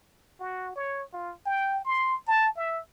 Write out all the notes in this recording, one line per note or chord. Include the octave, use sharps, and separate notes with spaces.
F#4
C#5
F4
G5
C6
A5
E5